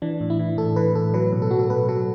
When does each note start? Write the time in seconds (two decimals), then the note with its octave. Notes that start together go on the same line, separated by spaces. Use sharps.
0.02 E3 D4
0.21 A2
0.30 E4
0.39 E3
0.58 A2 A4
0.76 E3 B4
0.95 A2 A4
1.14 F#3 B4
1.32 B2
1.42 A4
1.51 F#3 F#4
1.59 A4
1.70 B2 B4
1.88 F#3 A4